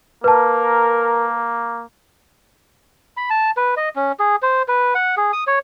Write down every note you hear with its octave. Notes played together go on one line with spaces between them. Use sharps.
A#3 A#4 B4 A5
B5
A5
B4
D#5
C#4
G#4
C5
B4
F#5
G#4
D#6
C#5